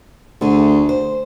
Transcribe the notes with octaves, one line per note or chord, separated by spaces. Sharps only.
D2 A3 G#4
C5